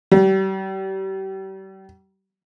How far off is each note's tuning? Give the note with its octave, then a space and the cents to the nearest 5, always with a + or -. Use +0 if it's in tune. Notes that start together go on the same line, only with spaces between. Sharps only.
G3 -35